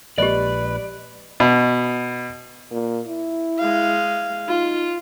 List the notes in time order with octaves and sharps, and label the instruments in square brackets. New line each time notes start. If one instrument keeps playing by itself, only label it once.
[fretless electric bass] A#1 A#2 G#3 [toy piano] G4 D#5 [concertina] B4 [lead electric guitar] D5
[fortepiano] B2
[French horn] A#2
E4
[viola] G#3 F5
[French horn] D#4 [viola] F4